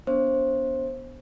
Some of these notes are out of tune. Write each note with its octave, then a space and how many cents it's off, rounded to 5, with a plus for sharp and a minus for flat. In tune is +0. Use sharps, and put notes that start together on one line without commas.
B3 +0 D4 -25 C5 +20